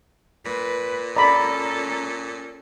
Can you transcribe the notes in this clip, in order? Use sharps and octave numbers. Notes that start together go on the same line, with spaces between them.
A#2 B4
C#4 A4 D5 A#5 B5